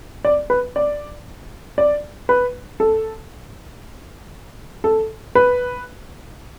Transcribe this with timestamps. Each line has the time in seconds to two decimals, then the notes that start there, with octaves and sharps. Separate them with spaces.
0.25 D5
0.50 B4
0.76 D5
1.78 D5
2.29 B4
2.80 A4
4.84 A4
5.35 B4